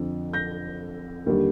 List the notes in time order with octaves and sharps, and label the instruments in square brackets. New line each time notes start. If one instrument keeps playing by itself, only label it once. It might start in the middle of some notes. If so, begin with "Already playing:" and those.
Already playing: [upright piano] F2 D3 F3
G6 A#6
D#2 D3 G3